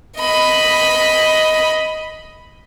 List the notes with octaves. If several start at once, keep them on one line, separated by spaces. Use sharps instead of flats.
D#5 B5